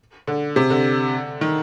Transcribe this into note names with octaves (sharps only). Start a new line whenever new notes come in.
D3
C3
D3
D#3